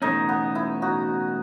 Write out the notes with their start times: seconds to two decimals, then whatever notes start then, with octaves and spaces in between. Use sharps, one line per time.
0.02 E2 B2 A3 C#4 D#4
0.29 B3
0.55 E4
0.82 D#4 F#4